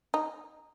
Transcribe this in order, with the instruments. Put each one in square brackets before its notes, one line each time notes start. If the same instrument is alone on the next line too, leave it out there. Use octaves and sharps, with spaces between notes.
[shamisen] D#4